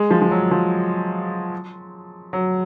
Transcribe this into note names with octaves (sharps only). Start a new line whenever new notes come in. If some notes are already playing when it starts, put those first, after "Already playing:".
Already playing: G#3
F3
F3
F#3
F3
F#3